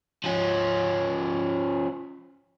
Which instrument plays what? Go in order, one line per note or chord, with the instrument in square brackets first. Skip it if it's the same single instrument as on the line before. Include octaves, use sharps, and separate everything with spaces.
[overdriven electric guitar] F3 C#4